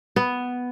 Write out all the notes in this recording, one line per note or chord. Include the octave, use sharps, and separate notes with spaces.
B3